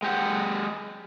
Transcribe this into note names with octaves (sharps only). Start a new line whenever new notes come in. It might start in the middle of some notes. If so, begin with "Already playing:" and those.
G#3 G4 F#5